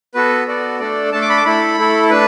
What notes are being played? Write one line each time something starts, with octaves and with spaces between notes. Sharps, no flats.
B3 F#4 A4 B4
B3 F#4 A4 D5
A3 D4 A4 D5
A3 D4 A4 A5
D6
B5
D6
A3 E4 A4 B5
A3 E4 A4
A3 D4 B4